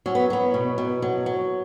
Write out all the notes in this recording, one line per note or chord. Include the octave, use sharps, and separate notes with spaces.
F#3 C#4
B3
F#3 B3
B2
B2
F#3
F#3